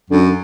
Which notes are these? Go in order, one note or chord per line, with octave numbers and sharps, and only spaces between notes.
F#2 D3